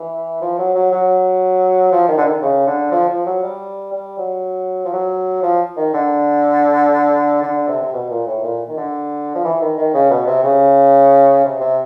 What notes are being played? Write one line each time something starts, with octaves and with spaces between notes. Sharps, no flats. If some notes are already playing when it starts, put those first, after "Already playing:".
Already playing: E3
F3
F#3
F#3
F#3
F3
D#3
D3
D#3
C#3
D3
F3
F3
F#3
G3
G3
F#3
F3
F#3
F3
D#3
D3
D3
C3
C3
B2
A#2
A2
A#2
D#3
D3
F3
E3
D#3
D#3
C#3
B2
C3
C#3
C3
C3